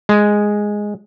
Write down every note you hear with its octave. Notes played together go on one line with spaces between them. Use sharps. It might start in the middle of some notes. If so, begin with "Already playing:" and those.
G#3